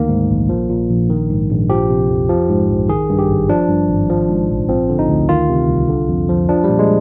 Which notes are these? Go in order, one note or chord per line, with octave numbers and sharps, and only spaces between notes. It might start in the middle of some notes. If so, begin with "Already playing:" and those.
Already playing: D2 D#3 A#3
G#2
A#1
F3
A#2
A#1
D#3
G#2
A#1
F3 G4
C3
F2
F3
G#2
A#1
D#3 G#4
G2
G4
G#1
F3 D4
G2
G#1
F3
G#2
A#1
F3 C4
D3
D#4
D2
D#3 F4
C3
C2
D3
F2
F3
F3 D4
G3
A#2
G#3